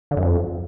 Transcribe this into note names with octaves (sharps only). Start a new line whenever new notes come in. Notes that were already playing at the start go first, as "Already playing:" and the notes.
D3
F#2
F2